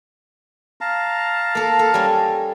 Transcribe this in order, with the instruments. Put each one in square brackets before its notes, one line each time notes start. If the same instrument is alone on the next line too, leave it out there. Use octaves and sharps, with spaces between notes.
[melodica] F5 A5 A#5
[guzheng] A#3 A4
A4
G3 C#4